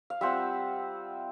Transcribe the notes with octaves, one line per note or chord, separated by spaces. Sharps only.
F5
G3 C4 F4 E5 F#5